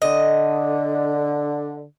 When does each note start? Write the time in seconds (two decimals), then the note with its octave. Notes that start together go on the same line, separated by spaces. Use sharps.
0.02 D3 D#5